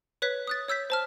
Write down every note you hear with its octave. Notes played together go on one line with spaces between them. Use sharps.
B4 C#5 F#6 B6
D#6 F#6 A6
C#5 E6 G6 B6
C5 A5 F6